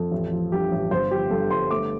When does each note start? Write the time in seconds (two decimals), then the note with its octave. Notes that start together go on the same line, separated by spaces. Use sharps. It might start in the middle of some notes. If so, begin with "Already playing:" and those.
Already playing: F2 A4
0.11 A1
0.32 F3
0.52 G2 G4
0.72 A1
0.91 G1 C5
1.11 F3 G4
1.31 G2 A4
1.51 G1 C6
1.71 A3 D6